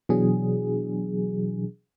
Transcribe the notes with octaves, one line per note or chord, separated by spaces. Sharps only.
B2 E3 F#3 D4 G#4